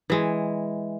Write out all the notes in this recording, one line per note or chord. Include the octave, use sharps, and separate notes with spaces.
E3 G#3